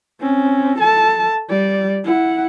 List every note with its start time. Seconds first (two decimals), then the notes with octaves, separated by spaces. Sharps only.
0.20 C4 C#4
0.78 A4 A5
1.49 G3 D5
2.04 E4 F#5